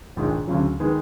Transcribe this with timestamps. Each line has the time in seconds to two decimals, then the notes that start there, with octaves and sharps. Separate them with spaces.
0.16 A#1 G#2 D#3 G#3
0.47 D2 C#3 F#3
0.80 D#3 G#3 B3